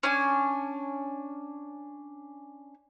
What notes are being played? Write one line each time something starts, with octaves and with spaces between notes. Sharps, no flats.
C#4 D4 G#5